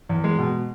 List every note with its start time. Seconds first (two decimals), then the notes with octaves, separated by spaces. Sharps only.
0.09 E2
0.24 G#3
0.38 B2